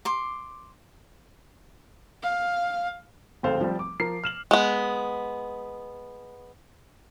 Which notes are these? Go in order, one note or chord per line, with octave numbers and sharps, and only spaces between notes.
C6 D6
F5
D1 G#1 C4 A4 C5 F5
F3 G3 C4
D6
F3 A#4 C7
F6 E7 F#7
G#3 B3